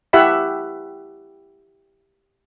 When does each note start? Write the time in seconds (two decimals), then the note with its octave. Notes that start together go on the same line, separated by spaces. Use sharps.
0.13 E4 G4 E5 F#5 B5